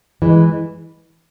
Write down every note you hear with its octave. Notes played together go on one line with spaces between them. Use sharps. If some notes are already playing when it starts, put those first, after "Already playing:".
E3 G#3